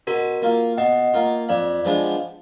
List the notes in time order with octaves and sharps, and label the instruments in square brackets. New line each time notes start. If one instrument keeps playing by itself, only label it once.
[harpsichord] B2 [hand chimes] F#4 A#4
[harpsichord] A#3 F4
[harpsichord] B2 [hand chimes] D#5 F#5
[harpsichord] A#3 F4
[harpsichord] F2 [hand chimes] D5 F5
[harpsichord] F3 G#3 B3 D4